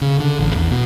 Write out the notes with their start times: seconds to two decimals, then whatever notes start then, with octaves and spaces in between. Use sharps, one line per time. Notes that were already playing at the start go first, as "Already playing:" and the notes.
0.01 C#3
0.20 D3
0.39 A1
0.55 E2
0.71 B2